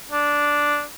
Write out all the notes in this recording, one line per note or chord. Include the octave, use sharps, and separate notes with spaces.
D4